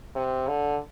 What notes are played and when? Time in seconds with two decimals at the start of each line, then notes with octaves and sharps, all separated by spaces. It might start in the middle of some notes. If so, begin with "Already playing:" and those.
0.15 C3
0.48 D3